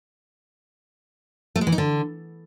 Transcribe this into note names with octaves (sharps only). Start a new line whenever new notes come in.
A3
G#3
E3
D#4
D3